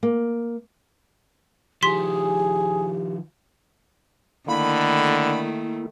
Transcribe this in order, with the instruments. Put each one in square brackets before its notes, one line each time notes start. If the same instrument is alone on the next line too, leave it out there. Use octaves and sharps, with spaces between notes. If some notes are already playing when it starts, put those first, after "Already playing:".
[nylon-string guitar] A#3
[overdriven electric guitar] D#3 F3 [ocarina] G4 [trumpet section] G#4 [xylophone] C6 B6
[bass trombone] D3 [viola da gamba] D#3 A3 [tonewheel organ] A#3 E4 [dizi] B5